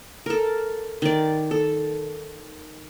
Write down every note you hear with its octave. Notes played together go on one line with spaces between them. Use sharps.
A4 A#4
D#3 D5
A4